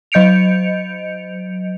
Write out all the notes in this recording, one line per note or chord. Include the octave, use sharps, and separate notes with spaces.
F#3 D#5 G6 C#7 D7 F7